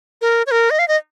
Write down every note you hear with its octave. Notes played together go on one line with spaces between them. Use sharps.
A#4
C#5
A#4
D#5
F5
D#5